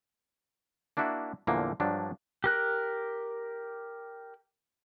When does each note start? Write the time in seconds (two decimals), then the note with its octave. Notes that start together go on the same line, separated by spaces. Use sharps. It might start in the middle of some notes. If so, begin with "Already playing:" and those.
0.97 A#3 D4 E4 F#4 E5
1.47 E2 A#2 D3 E3 F3 A#3
1.80 G2 F3 F#3 D4
2.44 G4 A#4 F#6